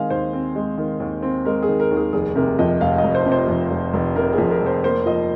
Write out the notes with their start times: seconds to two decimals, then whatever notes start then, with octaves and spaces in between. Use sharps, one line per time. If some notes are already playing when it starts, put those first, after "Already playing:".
Already playing: D#3 G#3 C4 F5 G#5
0.10 D#2 C5
0.33 C4
0.55 G#3
0.78 D#3
1.00 D#2
1.22 C4
1.45 G#3 A#4
1.62 G#4
1.68 D#3
1.80 A#4
1.91 D#2
1.97 G#4
2.13 F1 G#4
2.35 C3 A#4
2.59 F2 D#5
2.81 F1 F5
2.98 D#5
3.04 F1
3.15 C5
3.26 C3
3.32 C5
3.48 F2
3.70 F1
3.93 F1
4.16 C3 A#4
4.33 G#4
4.38 F2
4.50 A#4
4.61 F1
4.66 C5
4.84 A#3 C5
5.06 F3 D#5